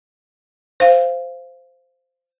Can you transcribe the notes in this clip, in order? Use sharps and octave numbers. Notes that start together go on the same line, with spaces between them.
C5 F5